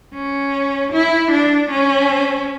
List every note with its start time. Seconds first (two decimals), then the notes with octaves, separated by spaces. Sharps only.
0.14 C#4
0.93 E4
1.31 D4
1.70 C#4